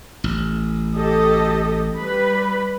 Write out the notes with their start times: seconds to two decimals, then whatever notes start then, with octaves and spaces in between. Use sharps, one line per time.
0.24 A1
0.97 G4 A4 D#5
1.97 G3 B4 B5